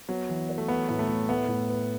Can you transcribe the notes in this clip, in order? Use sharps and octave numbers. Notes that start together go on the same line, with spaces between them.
F#3 B3
E3
C#5
A3
E3 B3
A2 B3
A3
A2
A3 B3
A2
B4